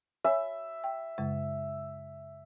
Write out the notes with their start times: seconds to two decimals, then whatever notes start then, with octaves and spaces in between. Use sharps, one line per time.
0.25 C#5 E5 G#5
0.84 G5
1.18 F#2 C#3 G#3